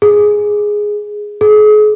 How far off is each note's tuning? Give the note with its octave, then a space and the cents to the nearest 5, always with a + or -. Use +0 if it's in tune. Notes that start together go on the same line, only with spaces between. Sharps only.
G#4 +0
G#4 +40